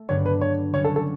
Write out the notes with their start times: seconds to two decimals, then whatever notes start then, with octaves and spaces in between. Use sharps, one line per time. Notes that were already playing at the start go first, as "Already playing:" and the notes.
Already playing: A3
0.08 G2 D3 F#3 B3 D4 C#5
0.26 B4
0.41 C#5
0.74 D3 G3 C#4 F#4 C#5
0.85 A4
0.96 A4